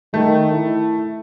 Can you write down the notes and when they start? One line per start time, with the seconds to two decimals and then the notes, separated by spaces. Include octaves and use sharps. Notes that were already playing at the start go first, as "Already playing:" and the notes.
0.14 D#3 A3
0.53 E4